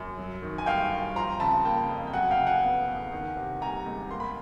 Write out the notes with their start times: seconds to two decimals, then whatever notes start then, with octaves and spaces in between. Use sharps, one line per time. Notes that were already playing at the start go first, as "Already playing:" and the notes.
Already playing: F#2
0.18 F#3
0.42 D#3
0.58 G#5
0.66 G2 F5 G5
0.91 G2
1.16 F3 A#5 C6
1.40 C#3 A5 B5
1.65 A#3 G5 A5
1.90 F2
2.07 G5
2.13 F#3 F#5 G#5
2.31 F5 G5
2.39 C#3
2.47 F#5 G#5
2.63 B3
2.87 E2
3.12 D#3
3.37 C3
3.61 G3 G#5 A#5
3.86 C#2
4.11 A#3 C6
4.20 B5